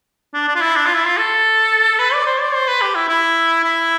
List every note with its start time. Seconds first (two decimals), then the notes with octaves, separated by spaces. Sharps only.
0.34 D4
0.48 D4
0.55 F4
0.61 E4
0.76 D4
0.86 F4
0.96 E4
1.06 F4
1.17 A4
1.99 B4
2.14 D5
2.26 C5
2.40 D5
2.54 C5
2.68 B4
2.82 G4
2.95 E4
3.09 E4
3.64 E4